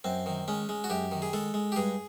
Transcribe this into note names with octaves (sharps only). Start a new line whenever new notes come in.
F#2 C4
D#3
G#3 C#4
G#3
F#4
F#2 G4
D#3
G#4
G#3 A4
G#3
G4
G2 G#4